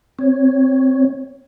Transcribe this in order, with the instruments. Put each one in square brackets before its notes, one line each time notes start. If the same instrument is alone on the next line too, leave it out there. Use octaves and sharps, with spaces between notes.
[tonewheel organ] C4 C#5